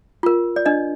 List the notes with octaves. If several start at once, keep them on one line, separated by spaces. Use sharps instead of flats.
F4 A#4
D5
D4 D#5